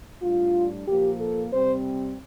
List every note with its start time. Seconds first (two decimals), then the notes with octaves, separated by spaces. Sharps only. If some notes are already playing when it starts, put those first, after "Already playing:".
0.21 A2 G3 D4 F4
0.87 A#2 F3 A#3 G4
1.19 A4
1.51 C3 G3 C4 C5